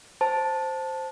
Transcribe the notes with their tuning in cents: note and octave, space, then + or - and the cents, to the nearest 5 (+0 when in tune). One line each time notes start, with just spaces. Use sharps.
C5 +0 A5 +0